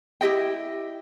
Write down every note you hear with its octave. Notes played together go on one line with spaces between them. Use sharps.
E4 G4 D#5 G5